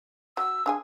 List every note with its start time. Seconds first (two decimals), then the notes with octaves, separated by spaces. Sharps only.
0.37 F#3 E6
0.66 D4 G#4 G#5